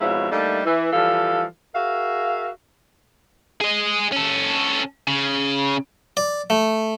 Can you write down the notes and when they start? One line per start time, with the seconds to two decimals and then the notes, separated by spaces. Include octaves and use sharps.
0.01 F2 G#2 B2 E4 C#5 F5
0.32 G3 A3 A#3 D4 D#4
0.65 E3
0.93 E3 F3 G3 A4 F5
1.75 F#4 G#4 A#4 E5 F5
3.61 G#4 D#5
4.12 C#4 A4
5.08 C#3
6.17 D5
6.50 A3